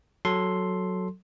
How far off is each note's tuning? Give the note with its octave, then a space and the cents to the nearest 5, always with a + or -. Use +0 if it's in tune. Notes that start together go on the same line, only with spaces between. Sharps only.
F#3 +0 A4 +0 C6 +0